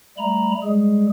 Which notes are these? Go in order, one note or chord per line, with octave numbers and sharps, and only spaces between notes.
G3 A3 A#5 B5
G3 G#3 G#4